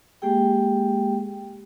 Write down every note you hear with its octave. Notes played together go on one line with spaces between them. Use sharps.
G#3 A#3 G4 G#4 G5